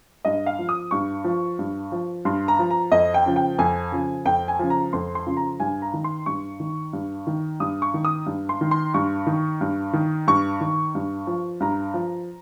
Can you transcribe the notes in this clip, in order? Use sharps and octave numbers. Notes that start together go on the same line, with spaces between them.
G2 D#5
F5
F3
D#6
G2 C#6
F3
G2
F3
G2 C6
A#5
F3
A#5
F2 D#5
G5
C#3 F3
G5
F2 G#5
C#3 F3
F2 G5
G#5
C#3 F3
A#5
F2 C6
C6
C#3 F3
A#5
G2 G#5
A#5
D#3
C6
G2 C#6
D#3
G2
D#3
G2 D#6
C#6
D#3
D#6
G2
C6
D#3
C6
G2 C#6
D#3
G2
D#3
G2 C#6
D#3
G2
F3
G2 A#5
F3